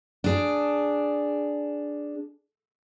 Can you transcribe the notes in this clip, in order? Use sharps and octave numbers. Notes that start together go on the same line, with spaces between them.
D4 G#4